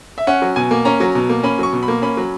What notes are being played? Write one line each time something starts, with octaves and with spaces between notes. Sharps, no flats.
E5
C#4 F#5
F#3
B2 G#5
A#3
C#4 A#5
F#3
B2
A#3
C#4 B5
F#3 C#6
B2
B5
A#3
C#4 B5
F#3